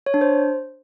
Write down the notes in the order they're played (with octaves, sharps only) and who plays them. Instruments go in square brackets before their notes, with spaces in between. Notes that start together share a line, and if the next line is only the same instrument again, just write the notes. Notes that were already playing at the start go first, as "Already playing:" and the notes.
[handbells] C#5
D4
C5